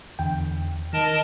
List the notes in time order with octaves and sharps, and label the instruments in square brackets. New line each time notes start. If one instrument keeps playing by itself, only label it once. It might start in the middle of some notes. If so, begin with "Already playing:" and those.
[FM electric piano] E2 D3 G5
[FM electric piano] D#3 [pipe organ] A#4 D#5 A5